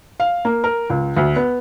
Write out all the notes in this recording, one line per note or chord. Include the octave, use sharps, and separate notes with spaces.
F5
A#3
A#4
C#2
D2
B3